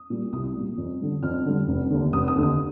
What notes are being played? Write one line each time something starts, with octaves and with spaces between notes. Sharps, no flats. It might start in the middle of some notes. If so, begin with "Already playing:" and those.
Already playing: D#6
A#2 G3
C2 D#6
A#2 G3
F2
D3 G3
F2 F6
D3 G3
F1
D#2 D3
F1 D#6
D#6
D#2 D3
D#6